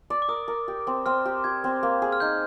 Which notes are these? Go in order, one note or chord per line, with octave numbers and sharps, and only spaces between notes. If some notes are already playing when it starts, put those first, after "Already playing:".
D5
D6
A#4 D#6
A#4
G4
C4
C4 F6
G4
G4 G#6
C4
A#3
G#4
F6
D#4 G6